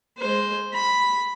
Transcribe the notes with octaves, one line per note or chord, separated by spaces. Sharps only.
G#3 C5
B5